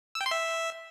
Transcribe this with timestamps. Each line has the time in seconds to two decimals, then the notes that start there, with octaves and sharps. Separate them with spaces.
0.15 E6
0.21 G5
0.26 C6
0.31 E5